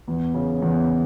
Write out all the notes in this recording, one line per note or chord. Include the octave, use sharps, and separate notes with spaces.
E2
C#3
E2